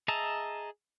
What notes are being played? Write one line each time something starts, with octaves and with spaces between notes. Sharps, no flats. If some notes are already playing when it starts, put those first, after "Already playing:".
G#4 D#5 E5 A5 A#5